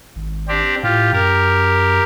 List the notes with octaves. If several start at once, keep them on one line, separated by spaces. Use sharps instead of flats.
G#1
C4 D4 G4
A2 F4 G4
F#2 G4 A#4